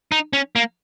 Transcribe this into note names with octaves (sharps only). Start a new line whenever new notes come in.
D#4
C#4
A#3